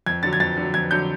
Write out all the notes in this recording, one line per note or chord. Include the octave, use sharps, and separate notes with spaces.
F2 G#6
D3 F#3 A6
G#6
F2 A6
D3
F#3
F2 G#6
D3 F#3 G6